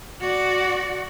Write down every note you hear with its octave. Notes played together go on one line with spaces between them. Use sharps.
F#4 D5